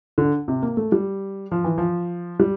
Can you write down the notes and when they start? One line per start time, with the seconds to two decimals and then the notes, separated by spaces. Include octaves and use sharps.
0.18 D3
0.48 C3
0.63 A#3
0.77 A3
0.92 G3
1.51 F3
1.64 E3
1.78 F3
2.39 G3